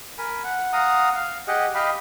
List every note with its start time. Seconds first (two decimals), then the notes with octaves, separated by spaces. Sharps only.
0.18 A#4 G#5 B5
0.44 F#5
0.73 F5 F#5 A#5 D#6
1.15 F5
1.48 G4 G#4 D#5 F#5
1.75 G4 D#5 F5 B5